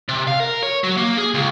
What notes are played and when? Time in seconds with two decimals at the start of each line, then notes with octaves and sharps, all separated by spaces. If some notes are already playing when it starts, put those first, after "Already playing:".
0.09 C3
0.27 F5
0.40 A#4
0.63 C#5
0.84 F#3
0.97 A#3
1.17 G#4
1.34 C#2